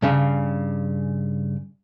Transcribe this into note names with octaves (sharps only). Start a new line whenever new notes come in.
G2 C#3